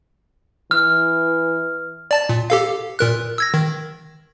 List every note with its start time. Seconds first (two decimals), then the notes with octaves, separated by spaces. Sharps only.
0.71 E3 F6
2.11 D5 A5 A6
2.29 A#2
2.50 G4 A4 F5
2.99 A#2 A#4 F#6
3.38 E6 G#6 A#6
3.54 D#3